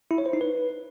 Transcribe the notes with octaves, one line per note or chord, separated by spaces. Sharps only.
E4
C#5
C5
D#4
B4